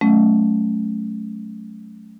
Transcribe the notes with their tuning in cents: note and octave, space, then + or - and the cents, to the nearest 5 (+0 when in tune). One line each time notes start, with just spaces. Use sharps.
F#3 +0 A3 -30 C#4 +0